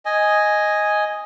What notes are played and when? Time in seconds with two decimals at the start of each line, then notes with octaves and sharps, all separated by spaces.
0.05 D#5 G#5